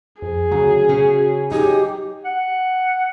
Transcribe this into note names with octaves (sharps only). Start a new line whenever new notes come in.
F2 G#4
D2 C#3 F#3
C#3 C#4
D#4 G4 G#4
F#5